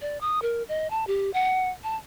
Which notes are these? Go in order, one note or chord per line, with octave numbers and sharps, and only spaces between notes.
D5
D#6
A#4
D#5
A5
G4
F#5
A5